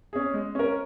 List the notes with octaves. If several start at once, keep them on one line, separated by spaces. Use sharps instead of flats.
C#4 G#4
G#3
C#4 A#4